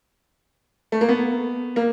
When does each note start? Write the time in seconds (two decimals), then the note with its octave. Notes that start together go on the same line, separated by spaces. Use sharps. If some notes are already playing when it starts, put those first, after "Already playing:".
0.92 A3
1.01 A#3
1.09 B3
1.76 A#3